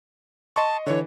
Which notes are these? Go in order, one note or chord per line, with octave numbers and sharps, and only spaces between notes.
D#5 A5 C6 C#6
D3 E3 C#5